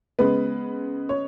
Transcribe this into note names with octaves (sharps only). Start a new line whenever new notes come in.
C#3 G#3 B3 B4
C#5